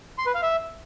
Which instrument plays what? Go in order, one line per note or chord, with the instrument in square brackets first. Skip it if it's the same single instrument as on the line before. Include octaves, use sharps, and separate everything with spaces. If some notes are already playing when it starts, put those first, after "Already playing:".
[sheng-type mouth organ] C6
B4
F5
E5